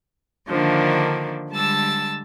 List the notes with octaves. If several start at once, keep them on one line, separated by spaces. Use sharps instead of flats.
D3 D#3 F3 A#3 D4
D3 G3 G#3 A5 E6 A6